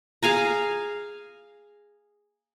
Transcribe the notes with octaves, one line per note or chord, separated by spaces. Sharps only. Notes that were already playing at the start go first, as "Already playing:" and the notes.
G#4 F5 G#5 A#5